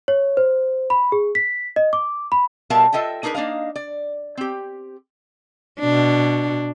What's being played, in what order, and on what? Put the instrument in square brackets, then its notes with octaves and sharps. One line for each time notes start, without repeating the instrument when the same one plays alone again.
[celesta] C#5
C5
B5
G#4
B6
D#5
D6
B5
[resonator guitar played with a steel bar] B2 G3 A#4 E5 F5 A5
F4 A4 D#5 E5 G5
D4 D#4 G#4 A#4 B4
A#3 D4 D#4 D#5 F5
D5
C4 G4
[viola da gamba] B2 D4